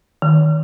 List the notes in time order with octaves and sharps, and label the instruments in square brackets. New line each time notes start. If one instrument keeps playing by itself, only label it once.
[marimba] D#3